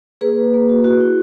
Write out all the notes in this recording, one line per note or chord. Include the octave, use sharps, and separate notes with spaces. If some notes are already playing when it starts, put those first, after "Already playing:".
A#3 G#4 B4
A#3
A#3
F#4
E4 F#4
E4